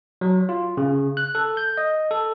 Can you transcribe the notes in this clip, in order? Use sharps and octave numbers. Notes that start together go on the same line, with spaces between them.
F#3
F4
C#3
F#6
A4
G6
D#5
A4